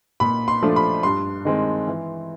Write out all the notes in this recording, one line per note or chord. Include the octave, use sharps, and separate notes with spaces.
A#2 B5
C6
F3 A3 D4 F4
B5
G2 C6
D#3 G#3 C4
E3